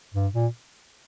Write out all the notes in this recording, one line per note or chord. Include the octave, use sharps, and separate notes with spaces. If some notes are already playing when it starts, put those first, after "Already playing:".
G2
A#2